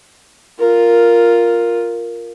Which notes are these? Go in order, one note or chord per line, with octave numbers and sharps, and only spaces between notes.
F4 A#4